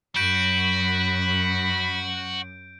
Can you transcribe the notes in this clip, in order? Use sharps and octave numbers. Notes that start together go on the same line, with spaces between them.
F#2 F#4 B5 G6 D7